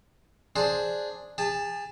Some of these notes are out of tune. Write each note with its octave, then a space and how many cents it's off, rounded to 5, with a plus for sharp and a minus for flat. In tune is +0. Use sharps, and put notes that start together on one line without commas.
D4 +0 G#4 +0 C5 +0
G#4 -35 A5 +0